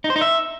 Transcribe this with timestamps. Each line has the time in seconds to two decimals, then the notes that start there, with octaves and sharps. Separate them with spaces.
0.04 D#4
0.10 C5
0.16 D#4
0.21 E5